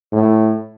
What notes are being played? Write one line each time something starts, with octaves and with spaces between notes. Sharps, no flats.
A2